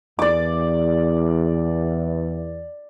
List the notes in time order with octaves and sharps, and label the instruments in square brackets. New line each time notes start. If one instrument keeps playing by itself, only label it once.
[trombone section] E2 [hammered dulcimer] D5 D6